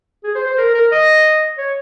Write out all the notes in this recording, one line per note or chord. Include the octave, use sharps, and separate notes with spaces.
G#4
C5
C5
A#4
A#4
D#5
C#5